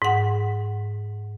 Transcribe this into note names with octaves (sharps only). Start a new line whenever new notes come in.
G#2 F#5